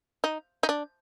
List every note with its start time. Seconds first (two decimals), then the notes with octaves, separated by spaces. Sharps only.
0.24 D#4
0.63 D#4
0.69 D4